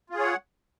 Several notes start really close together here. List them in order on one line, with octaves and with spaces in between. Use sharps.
F4 G#4 C#5 F#5